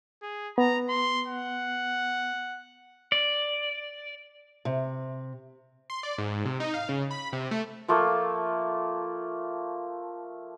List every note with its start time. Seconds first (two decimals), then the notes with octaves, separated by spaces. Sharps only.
0.22 G#4
0.58 B3 A#5
0.89 C6
1.27 F#5
3.12 D5
4.65 C3
5.90 C6
6.03 D5
6.18 G#2
6.45 C3
6.60 D#4
6.74 F5
6.89 C#3
7.11 B5
7.33 C3
7.51 A3
7.88 F3 A3 A#3